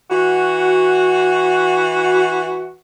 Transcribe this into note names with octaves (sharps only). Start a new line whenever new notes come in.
E3 F#4